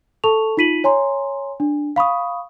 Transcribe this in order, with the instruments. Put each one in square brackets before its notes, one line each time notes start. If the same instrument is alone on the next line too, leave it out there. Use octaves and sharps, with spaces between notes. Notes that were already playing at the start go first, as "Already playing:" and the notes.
[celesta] A4 A5 C#6 F7
D#4 F4 B6 D#7 F#7
C#5 G#5 A#5 C6
D4
F5 B5 C#6 D#6